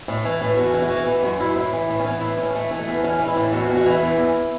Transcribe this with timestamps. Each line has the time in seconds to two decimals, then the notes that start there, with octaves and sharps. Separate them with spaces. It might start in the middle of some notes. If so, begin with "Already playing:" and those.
0.08 A2
0.25 E3
0.41 A2
0.57 E2 F#4
0.74 E3
0.82 F#4
0.90 E3
1.06 E3 F#4
1.22 F#2 F#4
1.40 F#2 E4
1.56 A2 E4
1.73 E3
1.89 A2
1.99 C#4
2.05 E3 B3
2.21 A2 E4
2.38 A2 C#4
2.55 E3 A3
2.71 E3
2.79 A3
2.88 E2
3.04 E3 C#4
3.19 E3
3.27 E4
3.36 A2
3.52 E2 F#4
3.65 F#4
3.69 E2
3.77 F#4
3.86 E3 E4
4.02 E2
4.18 E2